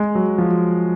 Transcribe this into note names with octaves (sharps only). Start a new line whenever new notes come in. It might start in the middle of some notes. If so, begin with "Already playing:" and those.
Already playing: G#3
F#3
F3